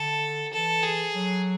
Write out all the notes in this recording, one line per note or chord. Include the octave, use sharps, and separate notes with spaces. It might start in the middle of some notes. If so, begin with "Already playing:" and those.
Already playing: D3 A4
E3 A4
G#4
F#3